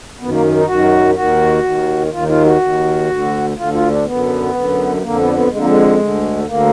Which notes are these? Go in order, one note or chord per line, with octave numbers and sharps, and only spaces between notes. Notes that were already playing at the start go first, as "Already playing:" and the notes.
F#2 D#3 B3
A#3
D#4
F#2 D#3 F#4
D#2 D#3 F#4
D#2 D#3
D#2 D#3 F4
D#4
F4
F#4
D#2 D#3
D2 D3
D2 D3 F4
F4
D4
F#2 D3 B3
F#2 D3
B3
F2 D3 A#3
B3
D4
B3
F2 D3 G#3
A#3
G#3
D2 D3
D2 D3 A#3